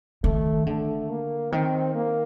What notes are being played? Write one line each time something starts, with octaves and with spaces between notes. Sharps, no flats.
D#3 A3
D3 A3
A#3
D#3 C4
A#3